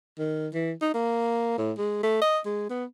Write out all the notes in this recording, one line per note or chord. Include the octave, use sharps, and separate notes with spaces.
D#3
E3
D#4
A#3
A2
G#3
A3
D#5
G#3
B3